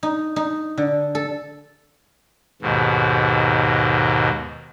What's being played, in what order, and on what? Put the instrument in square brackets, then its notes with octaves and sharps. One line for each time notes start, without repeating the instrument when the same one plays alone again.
[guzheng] D#4
D#4
D3
A4
[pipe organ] D#2 G#2 B2